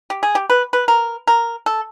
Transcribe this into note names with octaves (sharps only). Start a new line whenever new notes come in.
G4
G#4
G4
B4
B4
A#4
A#4
A4